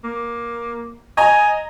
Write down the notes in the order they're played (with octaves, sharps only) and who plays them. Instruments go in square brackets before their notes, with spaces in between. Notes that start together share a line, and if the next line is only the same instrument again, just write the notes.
[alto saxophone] A#3
[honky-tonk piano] D#5 A#5 [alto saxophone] G#5